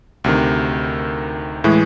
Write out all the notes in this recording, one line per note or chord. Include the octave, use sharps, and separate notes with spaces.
D2 C3 D#3
A2 E3 G#3